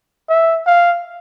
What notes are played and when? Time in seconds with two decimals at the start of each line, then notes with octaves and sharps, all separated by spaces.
0.29 E5
0.67 F5